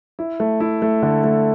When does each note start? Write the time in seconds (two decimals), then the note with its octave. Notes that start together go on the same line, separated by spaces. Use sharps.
0.19 E4
0.40 A3
0.60 E4
0.82 A3
1.03 D3
1.24 A3